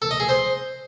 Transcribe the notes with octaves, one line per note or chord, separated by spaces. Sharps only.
A4
D#5
G#4
C5